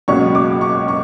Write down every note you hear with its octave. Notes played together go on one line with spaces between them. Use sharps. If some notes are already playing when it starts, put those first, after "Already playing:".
C#2 B2 F#3 A#3 C#4 C#6
D6
C#6
C#6